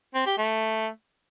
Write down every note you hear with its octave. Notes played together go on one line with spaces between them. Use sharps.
C4
G4
A3